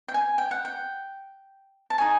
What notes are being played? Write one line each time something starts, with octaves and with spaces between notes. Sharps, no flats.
G5
G#5
G5
F#5
G5
A5
D#4 G#4 C#5 G#5